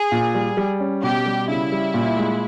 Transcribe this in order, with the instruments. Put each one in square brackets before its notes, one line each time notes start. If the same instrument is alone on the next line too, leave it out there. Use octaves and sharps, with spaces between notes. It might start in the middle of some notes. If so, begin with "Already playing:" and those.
Already playing: [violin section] G#4
[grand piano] A#2
G3
G3
C#4
[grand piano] B2 [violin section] G4
[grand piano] G3
[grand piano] C#3 [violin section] E4
[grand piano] G3
A#2
G#3